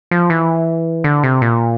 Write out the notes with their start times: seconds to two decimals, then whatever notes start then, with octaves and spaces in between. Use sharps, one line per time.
0.11 F3
0.30 E3
1.04 D3
1.24 C3
1.42 A#2